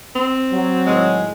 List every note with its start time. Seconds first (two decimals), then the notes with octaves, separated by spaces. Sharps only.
0.15 C4
0.52 F#3
0.86 A2 D#3 G#3